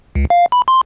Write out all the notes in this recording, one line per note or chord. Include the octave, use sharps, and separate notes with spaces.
C#2
F5
B5
C6